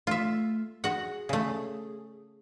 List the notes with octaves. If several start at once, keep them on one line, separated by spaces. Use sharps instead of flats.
A3 F4 E5
F#4 G#4 F#5
C#3 A3